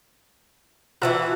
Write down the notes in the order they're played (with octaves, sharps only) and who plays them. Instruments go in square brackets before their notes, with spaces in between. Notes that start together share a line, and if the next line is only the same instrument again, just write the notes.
[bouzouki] E3 F#3 F#4 [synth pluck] F4 A5 E6